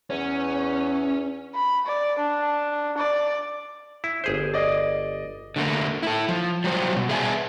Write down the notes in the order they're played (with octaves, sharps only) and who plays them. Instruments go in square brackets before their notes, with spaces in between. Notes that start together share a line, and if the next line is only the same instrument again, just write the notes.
[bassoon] E2 [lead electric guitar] C#4
[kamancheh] B5
D5
D4
D5
[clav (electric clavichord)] E4
G1 G#4 C5
[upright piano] D5 D#5
[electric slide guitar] D3 A3 A#3
E4 A4
F3
F#3 G3 C5
B2
G#4 B4 E5 F5 G#5 A5